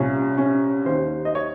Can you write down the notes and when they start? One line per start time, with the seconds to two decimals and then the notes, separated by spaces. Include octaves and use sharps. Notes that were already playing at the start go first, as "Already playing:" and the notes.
Already playing: C2 A#2 C#4
0.38 C#4
0.85 D#2 D#3 C5
1.25 D#5
1.35 C#5